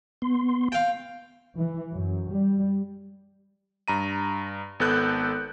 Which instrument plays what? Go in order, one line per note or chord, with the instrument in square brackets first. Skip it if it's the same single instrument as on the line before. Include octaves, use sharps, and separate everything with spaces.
[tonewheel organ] B3 C6
[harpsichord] F5 G5
[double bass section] E3
F#2
G3
[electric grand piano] G2 A#5 D#7
G#1 B3 A4 F#6 G6